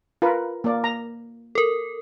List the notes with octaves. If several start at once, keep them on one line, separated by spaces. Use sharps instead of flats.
F4 A#4 B4
A#3 D5
A#5
A4 A#4